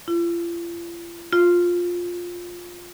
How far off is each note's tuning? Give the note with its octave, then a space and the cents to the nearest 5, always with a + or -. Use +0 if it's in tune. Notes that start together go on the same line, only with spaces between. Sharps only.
F4 -40
F4 +10